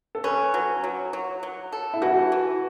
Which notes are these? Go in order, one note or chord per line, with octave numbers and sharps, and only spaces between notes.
A4
C#4 B4
F#3
F#3
F#3
F#3
A4
E4
E3 F#4
E3